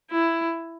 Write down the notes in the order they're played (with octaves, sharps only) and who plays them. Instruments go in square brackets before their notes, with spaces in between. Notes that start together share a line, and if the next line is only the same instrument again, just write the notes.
[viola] E4